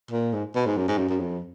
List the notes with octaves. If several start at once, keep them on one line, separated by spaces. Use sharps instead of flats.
A#2
G#2
B2
G#2
F#2
G#2
F#2
F#2
F2